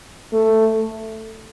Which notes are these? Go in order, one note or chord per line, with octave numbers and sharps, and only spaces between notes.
A3